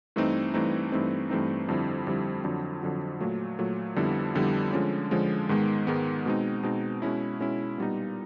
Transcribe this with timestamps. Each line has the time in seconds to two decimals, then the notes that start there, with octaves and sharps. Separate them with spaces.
0.16 G2 E3 A3 C4 D#4
0.54 G2 E3 A3 C4 D#4
0.92 G2 E3 A3 C4 D#4
1.29 G2 E3 A3 C4 D#4
1.69 F2 D3 G3 C4 E4
2.07 F2 D3 G3 C4 E4
2.44 F2 D3 F#3
2.83 F2 D3 F#3
3.20 A#2 F#3 A3
3.59 A#2 F#3 A3
3.96 F2 D3 G3 B3 E4
4.35 F2 D3 G3 B3 E4
4.73 D3 F3 G#3 C#4
5.11 D3 F3 G#3 C#4
5.49 G#2 D#3 G#3 B3
5.87 G#2 D#3 G#3 B3
6.26 B2 G#3 C4 D#4
6.63 B2 G#3 C4 D#4
7.02 B2 G#3 C#4 E4
7.40 B2 G#3 C#4 E4
7.78 A#2 G3 B3 D#4